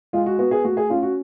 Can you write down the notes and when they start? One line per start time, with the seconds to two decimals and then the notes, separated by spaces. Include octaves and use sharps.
0.13 G#3 F4
0.26 F#4
0.39 B3 F#4
0.51 G#4
0.64 A3 F#4
0.77 G#4
0.90 C#4 F4
1.03 F#4